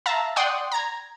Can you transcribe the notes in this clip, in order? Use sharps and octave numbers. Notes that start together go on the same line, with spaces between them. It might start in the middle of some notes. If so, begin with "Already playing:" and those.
E5 F5 A5 A#5
D5 F#5 G5 C6 C#6 D#6
A#5 G#6